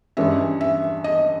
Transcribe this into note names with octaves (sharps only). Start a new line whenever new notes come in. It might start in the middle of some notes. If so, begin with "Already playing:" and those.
G2 E3 G#3 C#4 E5
E5
D#5